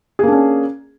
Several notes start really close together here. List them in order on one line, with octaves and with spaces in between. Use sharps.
G#4 A#3 D4 C#4